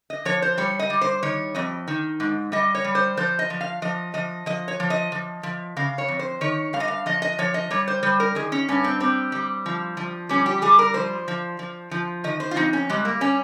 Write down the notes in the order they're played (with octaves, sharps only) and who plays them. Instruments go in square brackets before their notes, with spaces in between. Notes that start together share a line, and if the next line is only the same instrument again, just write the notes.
[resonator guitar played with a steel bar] D#5
F3 C#5
C5
G3 C#5
D#5
G3
C5
D#3 C#5
F2 D#5
D#3
G#2
G3 D#5
C#5
G3
C5
F3 C5
D#5
F3
F5
F3 D#5
F3 D#5
F3 D#5
C#5
F3
D#5
F3
F3
C#3 F5
C#5
F2
C5
D#3 C#5
G2 F5
D#5
F5
F3 D#5
D#5
F3 C#5
D#5
G3 C#5
C5
G3 C5
A#4
D#3 G#4
C#4
G2 C#4
C4
G3 C4
G3
F3
F3
G3 C#4
G4
G3 G#4
A#4
F3 C5
F3
F3
F3
D#3 D#5
C5
F4
F2 D#4
C#4
G3 G#3
A#3
G3 C#4